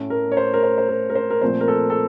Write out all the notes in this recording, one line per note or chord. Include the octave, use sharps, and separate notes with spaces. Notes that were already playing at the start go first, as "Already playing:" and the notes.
Already playing: A2 A3 C#4
A#4
C#5
C5
A#4
C5
C5
A#4
A#4
C5
A#4
A#2 F3 A3 C4 C5
A#4
A4
A4